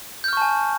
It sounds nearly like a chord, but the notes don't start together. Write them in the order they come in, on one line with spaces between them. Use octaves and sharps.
G6 F6 C#6 A5 G#5